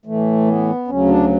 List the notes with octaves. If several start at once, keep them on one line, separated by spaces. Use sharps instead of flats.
A2 E3 A3
B3
D2 C#3 F#3 C#4
D4